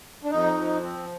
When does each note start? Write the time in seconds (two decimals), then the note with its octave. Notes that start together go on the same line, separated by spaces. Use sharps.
0.24 D4
0.31 F2 D#4
0.57 F3
0.83 C4